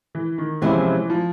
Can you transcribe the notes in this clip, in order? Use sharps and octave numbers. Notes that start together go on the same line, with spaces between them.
E3
D#3
C3 E3 F3 G#3 C#4 E4
F3